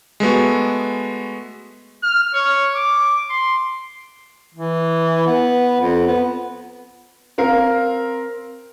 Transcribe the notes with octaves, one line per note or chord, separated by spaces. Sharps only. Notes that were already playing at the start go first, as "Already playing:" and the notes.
G#3 A3 B3 F#4
F6
C#5
D6
C6
E3
B3
F2
B3
C4 A#4 F5